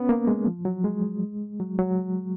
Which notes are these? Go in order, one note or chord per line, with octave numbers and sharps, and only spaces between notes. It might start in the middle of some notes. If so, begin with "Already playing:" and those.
Already playing: B3 C#4
A#3
G#3
F3
F#3
G#3
F#3
F#3